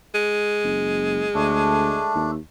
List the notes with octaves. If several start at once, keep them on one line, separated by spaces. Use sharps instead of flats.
G#3
F#1
D2 A3 D4
D#2